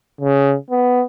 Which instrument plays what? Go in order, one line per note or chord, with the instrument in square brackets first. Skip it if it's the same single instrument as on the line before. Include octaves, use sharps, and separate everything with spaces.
[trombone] C#3
B3